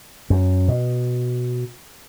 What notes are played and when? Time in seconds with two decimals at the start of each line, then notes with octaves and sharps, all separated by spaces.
0.30 F#2
0.68 B2